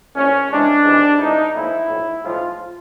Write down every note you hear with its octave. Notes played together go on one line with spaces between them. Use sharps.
A#1 A2 F3 C#4
C#2 C3 E3 G#3 D4
G#1 G#2 E3 G3
A1 G#2 E3 G#3 D#4
B1 A#2 F3 G#3 E4
B1 A2 F3
B1 A2 F3 G#3 F4